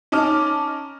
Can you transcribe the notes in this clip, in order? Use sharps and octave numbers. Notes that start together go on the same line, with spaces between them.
C#4 D#4 A5 D6 F6